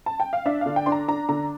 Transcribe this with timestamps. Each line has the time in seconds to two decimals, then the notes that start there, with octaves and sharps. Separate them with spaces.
0.06 A5
0.20 G5
0.33 F5
0.46 D4 E5
0.61 D3 F5
0.76 G5
0.86 D4 C6
0.92 A#5
1.08 D4 A#5
1.29 D3 A#5